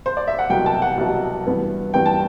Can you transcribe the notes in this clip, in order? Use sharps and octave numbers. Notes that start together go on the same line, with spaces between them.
C5
D5
E5
F#5
C2 B2 F#3 G5
A5
F#5
C2 B2 F#3
G2 E3 B3
G2 E3 B3 G5
A5